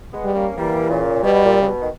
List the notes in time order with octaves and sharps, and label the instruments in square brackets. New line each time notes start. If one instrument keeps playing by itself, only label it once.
[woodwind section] G#3 B3
[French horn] G3
[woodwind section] A#3 C#4
[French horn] E3 [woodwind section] G3 A#3
[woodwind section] A#2 C#3
[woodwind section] B2 [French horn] G3
[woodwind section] A#2
C#3
B2
D#3